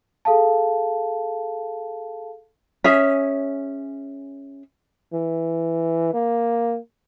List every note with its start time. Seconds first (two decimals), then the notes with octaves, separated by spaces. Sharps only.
0.25 G#4 A4 F5 A5
2.84 C#4 G#4 C#5 E5
5.13 E3
6.14 A#3